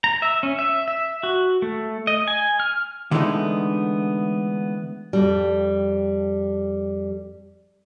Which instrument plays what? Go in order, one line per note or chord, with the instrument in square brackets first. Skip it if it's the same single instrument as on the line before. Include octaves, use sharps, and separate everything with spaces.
[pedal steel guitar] A#5
E5
C#4
E5
E5
F#4
A3
D#5
G#5
F6
[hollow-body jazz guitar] D3 E3 G#3 A3 B3 D#4
[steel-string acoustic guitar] F2 G3